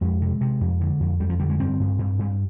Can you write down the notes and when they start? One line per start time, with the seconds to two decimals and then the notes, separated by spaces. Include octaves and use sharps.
0.01 F2 G#3
0.22 C3
0.41 C3
0.61 F2
0.81 D3
1.00 F2
1.20 F2 G3
1.30 F3
1.39 D3 G3
1.50 G#3
1.59 G2 C4
1.80 G2
1.99 G2
2.19 G2